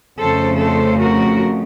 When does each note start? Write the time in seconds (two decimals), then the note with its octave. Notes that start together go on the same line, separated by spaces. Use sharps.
0.18 F2 C#3 A3 A4 C5
0.58 A4 C5
0.98 F#4 A#4